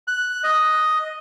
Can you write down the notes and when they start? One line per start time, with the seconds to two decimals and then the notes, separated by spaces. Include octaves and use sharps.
0.08 F#6
0.43 D#5